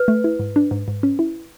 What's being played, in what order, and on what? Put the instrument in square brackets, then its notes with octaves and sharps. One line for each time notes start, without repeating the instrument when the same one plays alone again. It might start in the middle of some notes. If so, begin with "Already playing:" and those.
Already playing: [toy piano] B4
[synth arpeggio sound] A3
E4
G#2
D4
G#2
G#2
C#4
E4